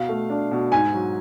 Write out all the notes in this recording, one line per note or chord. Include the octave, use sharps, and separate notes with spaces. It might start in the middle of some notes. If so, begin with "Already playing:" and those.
Already playing: B2 F5
A3
D4
B2
G#2 G#5
F#3